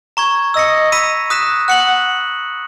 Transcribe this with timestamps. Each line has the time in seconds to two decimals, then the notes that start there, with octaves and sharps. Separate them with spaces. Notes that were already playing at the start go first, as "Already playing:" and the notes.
0.17 A#5 C#6 G#6
0.54 D#5 E6 A#6 C#7
0.92 B5 E6 B6 D#7
1.30 D#6 F#6 B6 E7
1.68 F#5 F#6 C#7 F#7